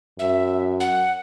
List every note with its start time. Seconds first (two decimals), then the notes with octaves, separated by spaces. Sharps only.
0.19 F#2 E5
0.80 F#5